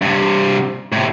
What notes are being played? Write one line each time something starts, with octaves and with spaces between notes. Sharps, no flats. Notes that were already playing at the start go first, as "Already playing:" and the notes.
G2 C3
A2 C3